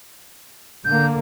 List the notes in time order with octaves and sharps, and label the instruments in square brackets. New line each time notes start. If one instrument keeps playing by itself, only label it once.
[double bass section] D3 A#3 [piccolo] G6